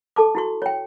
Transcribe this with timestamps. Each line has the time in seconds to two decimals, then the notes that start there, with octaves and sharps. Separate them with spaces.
0.16 A4 A5 D6
0.35 E4 F#4 C#6
0.62 C#5 G5